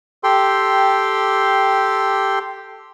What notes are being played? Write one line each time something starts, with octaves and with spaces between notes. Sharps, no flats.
G4 A4 G5 C6